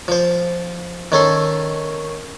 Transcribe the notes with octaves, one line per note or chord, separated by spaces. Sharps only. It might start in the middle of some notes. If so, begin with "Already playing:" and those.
F3 C5
D#3 C#4 A4 C6